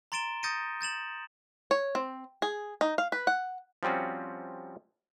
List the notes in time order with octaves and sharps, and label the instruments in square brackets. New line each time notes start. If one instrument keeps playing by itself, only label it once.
[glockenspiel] A#5 C6 A6 D7 E7 G7
D#6 G6 A6 A#6 C#7 D#7
G6 A6 E7 F#7
[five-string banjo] C#5
C4
G#4
D#4
F5
B4
F#5
[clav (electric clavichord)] F3 G3 C4 C#4 F#4